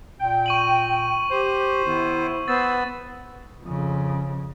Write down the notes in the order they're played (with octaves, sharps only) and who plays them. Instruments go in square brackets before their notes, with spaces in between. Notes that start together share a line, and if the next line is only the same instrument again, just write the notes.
[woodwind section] A#2 G5
[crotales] C#6 D#7 F#7
[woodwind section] G4 [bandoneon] C5
[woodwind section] D#3 B3 E4
[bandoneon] B3 [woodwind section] C5 E6 [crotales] A6
[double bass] F2 C#3